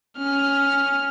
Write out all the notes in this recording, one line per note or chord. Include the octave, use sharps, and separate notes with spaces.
C#4 F6